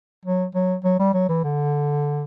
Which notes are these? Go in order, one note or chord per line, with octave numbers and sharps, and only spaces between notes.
F#3
F#3
F#3
G3
F#3
E3
D3